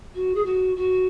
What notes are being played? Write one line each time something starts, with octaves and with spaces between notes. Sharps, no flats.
F#4
G#4
F#4
F#4